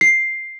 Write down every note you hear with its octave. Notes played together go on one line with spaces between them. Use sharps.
C7